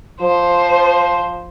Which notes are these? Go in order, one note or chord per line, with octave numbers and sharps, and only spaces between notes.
F3 C5